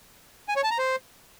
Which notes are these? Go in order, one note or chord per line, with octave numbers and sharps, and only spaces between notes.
G#5
C#5
A5
A#5
C5